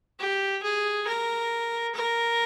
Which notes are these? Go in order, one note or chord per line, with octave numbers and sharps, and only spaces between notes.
G4
G#4
A#4
A#4